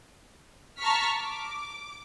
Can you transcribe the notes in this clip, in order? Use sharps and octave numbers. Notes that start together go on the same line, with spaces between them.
A5 A#5 C#6 F6 B6
D6